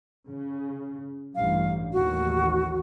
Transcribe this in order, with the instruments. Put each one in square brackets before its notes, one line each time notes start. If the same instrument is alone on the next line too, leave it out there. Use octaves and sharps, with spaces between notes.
[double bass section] C#3
[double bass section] A1 G2 [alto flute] F5
[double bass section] A1 D#2 [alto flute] F#4